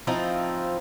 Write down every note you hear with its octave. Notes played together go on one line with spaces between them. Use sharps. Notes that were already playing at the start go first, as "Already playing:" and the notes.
F3 C4 D#4 E4